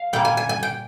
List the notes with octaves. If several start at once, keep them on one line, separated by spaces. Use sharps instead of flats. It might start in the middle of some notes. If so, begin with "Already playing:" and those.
Already playing: F5
A#2 G3 A#3 G5
G#5
G#5
G#5
G5